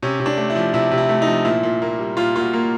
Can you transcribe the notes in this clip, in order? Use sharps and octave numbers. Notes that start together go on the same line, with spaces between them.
C3 C#4
C3
D4
A3
E4
F3
C3 E4
C3
E4
A3
D#4
F3
A#2 E4
A#2
A#3
G3
A#2 F4
A#2 F4
F#4
A#3